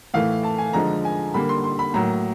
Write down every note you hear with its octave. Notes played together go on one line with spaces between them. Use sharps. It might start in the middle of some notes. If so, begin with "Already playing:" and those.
A2 E3 A3 F5
A5
G#5
D3 F3 G#3 A#5
G#5
D3 G3 A#3 B5
C6
C6
B5
A2 F#3 A#3 A#5